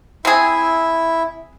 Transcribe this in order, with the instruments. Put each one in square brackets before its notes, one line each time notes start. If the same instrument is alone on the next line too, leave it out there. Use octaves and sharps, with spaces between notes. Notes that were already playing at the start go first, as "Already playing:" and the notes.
[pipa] C4 G#4 [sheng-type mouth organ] E4 E5